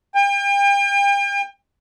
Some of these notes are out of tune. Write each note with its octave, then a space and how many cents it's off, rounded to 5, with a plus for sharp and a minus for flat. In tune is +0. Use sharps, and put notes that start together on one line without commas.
G5 +40